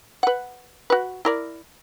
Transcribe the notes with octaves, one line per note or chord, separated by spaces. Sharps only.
B4 F#5
F#4 B4
E4 A#4 D5